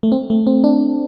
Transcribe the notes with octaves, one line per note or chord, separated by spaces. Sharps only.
A3
C4
A3
C4
D4